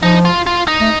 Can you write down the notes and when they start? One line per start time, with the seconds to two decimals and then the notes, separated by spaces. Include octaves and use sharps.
0.02 F3 D#4
0.25 F4
0.47 F4
0.68 D#4
0.81 A3